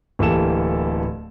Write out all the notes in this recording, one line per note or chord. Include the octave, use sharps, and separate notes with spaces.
D1 E3 A#3 G4 A4 E7